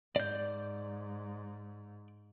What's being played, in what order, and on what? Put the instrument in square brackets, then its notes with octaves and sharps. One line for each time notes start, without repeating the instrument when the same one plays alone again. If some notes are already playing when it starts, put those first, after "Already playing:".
[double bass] G#2 [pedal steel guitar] D5 G6